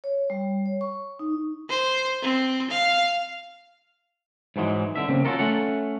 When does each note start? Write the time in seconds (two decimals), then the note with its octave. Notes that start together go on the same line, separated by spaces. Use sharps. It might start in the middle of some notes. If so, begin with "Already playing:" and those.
0.04 C#5
0.30 G3
0.66 C#5
0.81 C#6
1.19 D#4
1.69 C5
2.22 C4
2.71 F5
4.56 G#2 E3 F#3 G#3
4.96 C2 D3 E5
5.08 C#3 A#3 C4
5.25 C#4 D4 F4 F#4 A4 A#4
5.39 A3 C#4 F#5